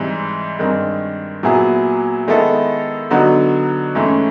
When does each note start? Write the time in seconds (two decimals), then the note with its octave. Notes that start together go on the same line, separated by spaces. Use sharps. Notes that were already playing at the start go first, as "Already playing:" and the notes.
Already playing: G#2 E3 G3 C4
0.59 G2 D#3 G#3 C4
1.43 A#2 F#3 B3 E4 G#4
2.27 D#3 G#3 B3 E4 A4
3.10 D3 F#3 B3 D#4 F#4
3.95 G#2 E3 A3 C#4